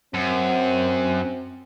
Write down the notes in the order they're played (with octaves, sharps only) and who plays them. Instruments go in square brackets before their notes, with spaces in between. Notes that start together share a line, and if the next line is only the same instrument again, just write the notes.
[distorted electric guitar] F#2 [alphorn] C4